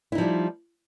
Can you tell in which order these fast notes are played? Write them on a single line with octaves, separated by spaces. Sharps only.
E4 D#4 F3 G3